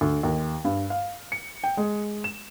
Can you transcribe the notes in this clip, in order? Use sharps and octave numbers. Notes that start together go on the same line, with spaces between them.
D2
D#2
G2
F5
C#7
G5
G#3
E7